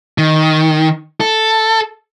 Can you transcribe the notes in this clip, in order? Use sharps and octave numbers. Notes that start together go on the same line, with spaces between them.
D#3
A4